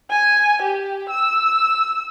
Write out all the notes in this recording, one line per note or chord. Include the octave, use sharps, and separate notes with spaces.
G#5
G4
E6